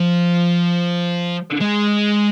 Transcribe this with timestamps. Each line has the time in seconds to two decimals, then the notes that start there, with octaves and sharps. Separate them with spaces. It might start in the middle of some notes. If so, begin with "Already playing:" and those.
Already playing: F3
1.61 G#3